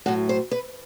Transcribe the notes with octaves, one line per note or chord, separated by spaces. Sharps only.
A2 F#3 F#4
C5
B4